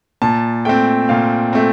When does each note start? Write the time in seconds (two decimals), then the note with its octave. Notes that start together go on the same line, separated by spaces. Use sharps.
0.22 A#2 A5
0.65 A3 C4 G5
1.09 A#2 F5
1.53 A3 C4